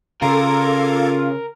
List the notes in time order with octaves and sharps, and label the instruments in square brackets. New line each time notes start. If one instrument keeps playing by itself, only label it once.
[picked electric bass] C#3 [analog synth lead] F4 [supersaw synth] A4 D6 G#6 [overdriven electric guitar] A#4